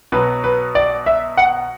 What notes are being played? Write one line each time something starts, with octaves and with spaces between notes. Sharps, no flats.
B2 F#3 B4
B4
D5
E5
F#5